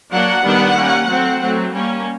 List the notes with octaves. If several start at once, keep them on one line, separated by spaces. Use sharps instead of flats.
F#3 A#3 D4 F#5
D#3 G3 B3 D4
G3 A#3 C#4
F#3 A3 C4
F#3 A3 C4
G3 A#3 C#4